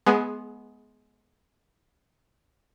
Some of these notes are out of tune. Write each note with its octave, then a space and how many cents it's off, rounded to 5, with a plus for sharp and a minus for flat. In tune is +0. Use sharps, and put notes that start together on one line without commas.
G#3 +25 B3 +0 G#4 +0